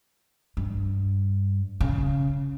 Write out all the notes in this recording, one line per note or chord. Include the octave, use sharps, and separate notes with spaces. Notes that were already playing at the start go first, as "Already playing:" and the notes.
G2
C#3